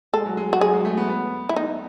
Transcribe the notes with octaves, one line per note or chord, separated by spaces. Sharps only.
G#3 A4
F#3
G#3
G#3 F#4
F#3 G#4
G#3
A3
B3
B3
E4
D#4